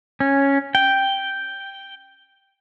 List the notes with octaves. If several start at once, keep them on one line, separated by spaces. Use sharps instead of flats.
C#4
G5